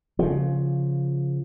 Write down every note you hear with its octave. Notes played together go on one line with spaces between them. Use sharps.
C#3 F3